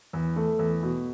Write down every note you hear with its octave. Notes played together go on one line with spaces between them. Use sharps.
E2
A3
E2
B2